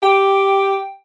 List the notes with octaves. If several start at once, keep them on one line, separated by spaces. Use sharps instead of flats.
G4 G5